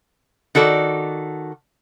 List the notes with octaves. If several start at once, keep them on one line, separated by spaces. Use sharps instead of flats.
D#3 F#4 A4 D5